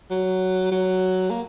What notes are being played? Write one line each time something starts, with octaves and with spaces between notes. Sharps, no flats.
F#3
F#3
A#3